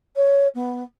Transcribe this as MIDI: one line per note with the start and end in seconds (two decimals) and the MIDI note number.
0.16 0.48 73
0.55 0.84 59